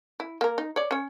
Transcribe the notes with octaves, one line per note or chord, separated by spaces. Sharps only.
E4
A#3 A#4
D#4
C#5 D5
C#4 C#5